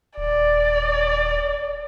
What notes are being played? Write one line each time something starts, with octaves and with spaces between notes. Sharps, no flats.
D#1 D5